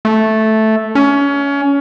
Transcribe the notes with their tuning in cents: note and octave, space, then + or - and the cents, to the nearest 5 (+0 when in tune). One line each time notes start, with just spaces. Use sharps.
A3 -5
C#4 +25